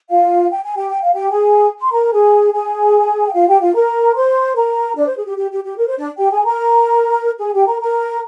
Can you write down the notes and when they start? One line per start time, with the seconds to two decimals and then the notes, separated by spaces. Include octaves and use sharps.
0.10 F4 F5
0.50 G5
0.63 G#5
0.76 G4 G5
0.90 G5
1.02 F5
1.14 G4 G5
1.31 G#4 G#5
1.81 C6
1.92 A#4 A#5
2.12 G#4 G#5
2.52 G#4 G#5
3.26 G5
3.34 F4 F5
3.47 G4 G5
3.61 F4 F5
3.75 A#4 A#5
4.15 C5 C6
4.56 A#4 A#5
4.96 D4 D5
5.06 C5
5.17 G#4
5.27 G4
5.37 G4
5.51 G4
5.64 G4
5.77 A#4
5.88 C5
5.97 D4 D5
6.18 G4 G5
6.32 G#4 G#5
6.45 A#4 A#5
7.39 G#4 G#5
7.53 G4 G5
7.67 A#4 A#5
7.81 A#4 A#5